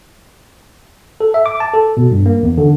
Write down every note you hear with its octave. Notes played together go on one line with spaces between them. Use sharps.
A4
E5
D6
A5
A4
B2
G2
A#3
E2
D3